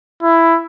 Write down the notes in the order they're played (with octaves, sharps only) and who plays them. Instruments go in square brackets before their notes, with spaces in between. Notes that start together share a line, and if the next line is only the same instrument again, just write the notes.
[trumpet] E4